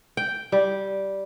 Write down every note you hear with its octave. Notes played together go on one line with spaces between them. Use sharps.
G5
G3